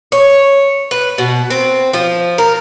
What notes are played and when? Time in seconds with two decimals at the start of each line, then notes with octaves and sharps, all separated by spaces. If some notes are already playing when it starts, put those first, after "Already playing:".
0.12 C#5
0.91 B4
1.18 B2
1.50 C4
1.93 F3
2.38 A#4